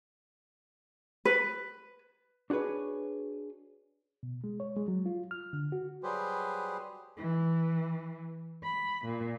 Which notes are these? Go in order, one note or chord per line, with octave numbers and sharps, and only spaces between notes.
B4
D4 F#4 G#4 B4 C#5
B2
G#3
C#5
G#3
F#3
F4
F6
D3
F#4
F#3 G3 G4 G#4 B4 C5
E3
B5
A#2